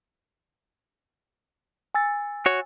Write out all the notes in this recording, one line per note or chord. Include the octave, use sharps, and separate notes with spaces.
G#5 E6 A6
F#4 C#5